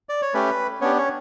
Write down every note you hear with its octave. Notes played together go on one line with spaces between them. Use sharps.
D5
C#5
A3 C#4 G4 B4
B3 C#4 D4 G4 C#5
C#4 C#5